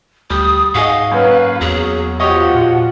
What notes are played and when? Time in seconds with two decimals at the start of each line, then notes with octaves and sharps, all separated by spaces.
0.30 D2 G3 D#6
0.74 G#2 F#4 G#4 D#5 F5
1.12 F#2 A#3 C#4 B4
1.61 E2 F#3 G#4
2.20 F3 F#4 G4 C#5 D#5 F#5
2.55 A#2